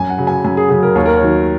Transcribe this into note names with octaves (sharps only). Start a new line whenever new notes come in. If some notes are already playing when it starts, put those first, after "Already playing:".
Already playing: F#2 G#5
F#5
C#3 F#3
G#5
F#2 G#5
G#4
C#3 F#3 G#4
A#4
D#2 C#5
A#4
C#5
D#3 F#3